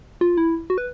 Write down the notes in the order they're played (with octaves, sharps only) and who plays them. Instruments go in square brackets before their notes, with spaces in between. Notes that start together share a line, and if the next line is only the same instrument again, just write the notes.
[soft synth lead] F4
E4
F#4
B4